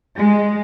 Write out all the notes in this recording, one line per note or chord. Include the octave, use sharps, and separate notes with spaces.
G#3